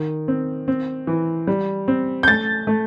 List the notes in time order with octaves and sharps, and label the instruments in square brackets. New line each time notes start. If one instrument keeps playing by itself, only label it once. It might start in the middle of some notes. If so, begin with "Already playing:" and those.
Already playing: [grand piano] D#3
C4
C4
E3
G3
C4
G6
A3 A6
A3